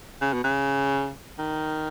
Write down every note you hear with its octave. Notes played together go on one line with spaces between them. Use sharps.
C#3
B2
C#3
D#3